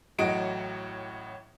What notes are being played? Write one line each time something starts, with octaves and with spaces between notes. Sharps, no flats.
A1 A2 F#3 F#4 D#5 D7